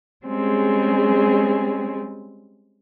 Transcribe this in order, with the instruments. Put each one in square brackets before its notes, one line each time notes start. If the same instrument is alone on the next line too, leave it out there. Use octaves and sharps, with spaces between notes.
[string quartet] G3 G#3 C4 C#4 G#4